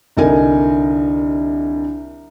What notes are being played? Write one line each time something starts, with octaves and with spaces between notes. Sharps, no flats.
C2 D3 D#4 A#4 G#5